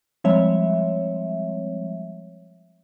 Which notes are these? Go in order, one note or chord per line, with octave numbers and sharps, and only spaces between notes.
F3 G3 G#3 C4 C#5 E5